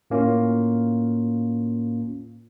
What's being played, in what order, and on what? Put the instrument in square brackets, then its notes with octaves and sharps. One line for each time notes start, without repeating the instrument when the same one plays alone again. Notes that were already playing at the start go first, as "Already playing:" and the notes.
[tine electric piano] A2 A#3 C#4 F4